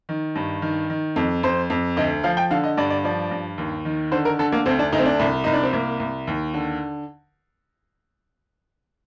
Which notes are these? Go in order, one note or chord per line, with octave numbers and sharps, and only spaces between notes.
D#3
G2
D#3
D#3
F2
F2 C5
F2
D2 D#5
F3 F5
G5
D3 F5
D#5
G2 D5
D5
F3 D5
G2
D#2
D#3
D3 C5
A#4
D3 A4
A#3
D2 C4
D4
D2 D#4
C4
D4
C2
C2 D#4
D4
C4
C2 A#3
C2
D#2
D3